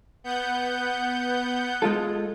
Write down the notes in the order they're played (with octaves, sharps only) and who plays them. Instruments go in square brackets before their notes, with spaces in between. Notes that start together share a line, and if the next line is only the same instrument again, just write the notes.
[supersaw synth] B3 F#5 G6
[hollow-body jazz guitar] G#3 F4 A4